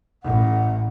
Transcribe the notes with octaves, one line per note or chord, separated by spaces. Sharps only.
A1 F#5